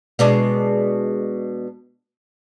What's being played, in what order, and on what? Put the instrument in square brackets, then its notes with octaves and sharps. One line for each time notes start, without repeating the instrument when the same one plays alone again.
[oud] B2 G#3 D4